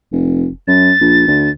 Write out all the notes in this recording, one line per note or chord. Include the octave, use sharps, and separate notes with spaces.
F1
F#2 A6
A#1
D2